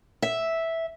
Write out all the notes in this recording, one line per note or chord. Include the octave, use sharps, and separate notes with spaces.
E5